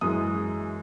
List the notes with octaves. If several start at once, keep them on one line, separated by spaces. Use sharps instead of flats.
F#2 E3 G#3 D#6